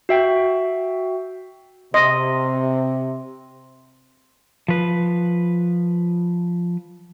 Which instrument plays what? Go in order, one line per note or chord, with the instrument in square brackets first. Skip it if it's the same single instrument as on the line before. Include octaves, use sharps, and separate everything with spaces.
[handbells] F#4 E5 G5
[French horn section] C3 [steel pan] D#5 [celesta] C6
[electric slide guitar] F3 B4